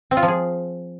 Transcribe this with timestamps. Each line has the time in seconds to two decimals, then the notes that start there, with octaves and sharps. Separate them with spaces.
0.11 C4
0.17 F4
0.23 F3
0.28 G#4